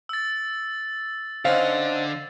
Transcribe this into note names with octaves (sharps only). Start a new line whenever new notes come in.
E6 A6
D3 C4 C#4 D#4 F5 F#5